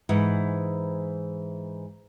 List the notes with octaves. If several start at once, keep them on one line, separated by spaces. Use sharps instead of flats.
G#2 E3 B4 F#5